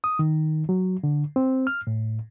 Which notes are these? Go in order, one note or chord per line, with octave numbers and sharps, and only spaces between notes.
D#6
D#3
F#3
D3
C4
F6
A2